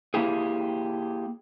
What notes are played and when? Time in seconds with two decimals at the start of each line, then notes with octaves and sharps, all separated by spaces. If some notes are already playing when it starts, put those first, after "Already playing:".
0.14 A#3 E4 G4 G#4